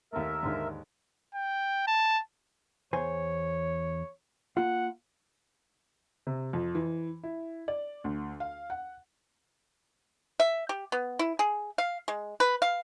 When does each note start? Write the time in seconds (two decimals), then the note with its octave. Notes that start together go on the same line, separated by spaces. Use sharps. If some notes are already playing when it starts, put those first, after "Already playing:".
0.13 D#2 A3 A#4 E5
0.43 D#2 G#2 D3
1.34 G5
1.87 A5
2.93 E2 C5 C#5 G#5
4.57 A#3 F4 F#5
6.27 C3
6.53 F2
6.75 E3
7.23 E4
7.68 D5
8.04 D2
8.40 F5
8.70 F#5
10.40 E5
10.69 G4
10.92 B3
11.19 E4
11.39 G#4
11.78 F5
12.08 G#3
12.40 B4
12.62 F5